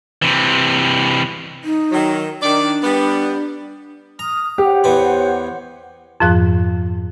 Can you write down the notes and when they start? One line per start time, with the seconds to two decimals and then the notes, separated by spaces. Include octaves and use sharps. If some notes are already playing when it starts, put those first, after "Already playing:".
0.22 C3 E3
1.64 D#4
1.92 D#3 F#3
2.42 D#3 D4 D5
2.84 G3 B3
4.19 A#5 D#6 F6
4.58 G4 C5 C#5 F#5
4.84 E2 E3 B5
6.20 F2 G#2 F3 F#6